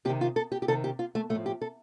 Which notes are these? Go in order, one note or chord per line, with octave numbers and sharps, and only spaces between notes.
C3 D#3 G4
F4
A4
G4
G4
C3 D#3 A4
G4
F4
A3
A2 A3
F3
G4
A4